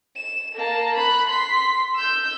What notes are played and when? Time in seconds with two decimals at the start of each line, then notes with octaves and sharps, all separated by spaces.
0.16 E7
0.55 A#3 A5
0.96 B5 F#6
1.28 C6 B6
1.95 E6 G6